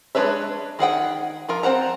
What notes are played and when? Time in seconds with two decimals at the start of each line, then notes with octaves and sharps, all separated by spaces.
0.15 G#3 D4 B4 C#5 E5
0.79 D#3 G#4 F#5 G5
1.48 F3 F4 A#4
1.63 C4 C5 F#5 A#5